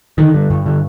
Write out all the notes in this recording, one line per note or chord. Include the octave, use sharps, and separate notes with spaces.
D3 D#3
G2
G2
D3